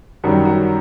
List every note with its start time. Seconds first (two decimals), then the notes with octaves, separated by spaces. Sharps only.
0.23 F#2 D#3 G3 F#4
0.45 F#4